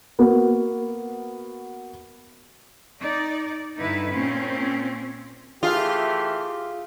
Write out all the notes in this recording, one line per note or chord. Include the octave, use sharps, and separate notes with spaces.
A#3 B3 F#4
D#4 D5
G2 D3 D#4 E4 B4
A#2 C4 C#4
E3 A3 F4 G4 G#4 F5 F6